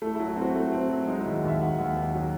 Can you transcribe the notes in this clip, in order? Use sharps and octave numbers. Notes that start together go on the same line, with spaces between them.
A3 E4
E4
F#3
E4
C4
F#4
A3 E4
C4
F#3
G#3 D#4
E4
D#2
F#4
D#2 E5
D#2 F#5
D#2
D#2
F#3